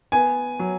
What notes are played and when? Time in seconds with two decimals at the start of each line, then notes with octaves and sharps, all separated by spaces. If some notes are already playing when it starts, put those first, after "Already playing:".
0.12 B3 G#5
0.59 F#3